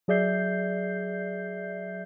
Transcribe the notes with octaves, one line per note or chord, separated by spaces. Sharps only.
F#3 G#4 D5 E5 G6 C7